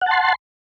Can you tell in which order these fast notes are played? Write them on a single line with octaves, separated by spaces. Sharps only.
F#5 A5 C6